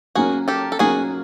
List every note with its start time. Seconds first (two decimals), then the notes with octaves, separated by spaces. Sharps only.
0.15 F#3 A#3 C#4 F#4 G#4
0.48 G4 A4
0.72 A4
0.79 F#3 A#3 C#4 F#4 G#4